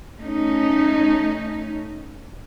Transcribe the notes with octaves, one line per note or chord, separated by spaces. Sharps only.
A3 C#4 D#4